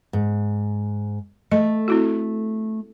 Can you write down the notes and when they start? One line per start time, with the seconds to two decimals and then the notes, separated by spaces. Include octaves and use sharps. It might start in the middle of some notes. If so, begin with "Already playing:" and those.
0.13 G#2
1.52 A3 D#5
1.88 C4 E4 F#4